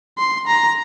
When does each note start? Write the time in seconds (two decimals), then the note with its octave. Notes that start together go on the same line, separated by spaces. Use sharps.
0.18 C6
0.47 A#5